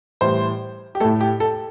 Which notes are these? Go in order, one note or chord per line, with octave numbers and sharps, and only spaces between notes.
A2 E3 G3 C5
G4
A2 A3 A4
G4
A4